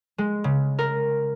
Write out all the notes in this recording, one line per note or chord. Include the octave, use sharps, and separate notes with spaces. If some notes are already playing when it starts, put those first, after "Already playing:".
G#3
C#3
A#4